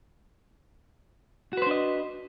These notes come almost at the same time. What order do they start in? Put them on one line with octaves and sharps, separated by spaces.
F#4 B4 C5 D4 D#5